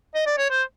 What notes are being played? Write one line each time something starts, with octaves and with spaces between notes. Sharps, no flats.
D#5
D5
C#5
C5